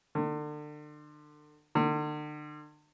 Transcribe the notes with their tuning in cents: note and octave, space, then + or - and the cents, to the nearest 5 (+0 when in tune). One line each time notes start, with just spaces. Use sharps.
D3 +35
D3 +40